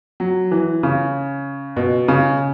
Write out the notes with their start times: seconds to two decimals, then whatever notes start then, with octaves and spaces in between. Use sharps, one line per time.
0.20 F#3
0.52 E3
0.83 C#3
1.77 B2
2.08 C#3